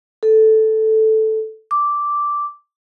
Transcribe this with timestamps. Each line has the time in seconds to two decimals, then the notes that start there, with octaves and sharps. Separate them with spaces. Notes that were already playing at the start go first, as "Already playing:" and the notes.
0.23 A4
1.71 D6